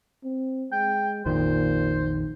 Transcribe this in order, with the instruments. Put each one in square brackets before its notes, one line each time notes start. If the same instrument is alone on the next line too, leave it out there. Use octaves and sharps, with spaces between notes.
[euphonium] C4
[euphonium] G#3 [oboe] G5
[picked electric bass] A#1 F2 D#3 [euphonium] A#2 [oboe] C5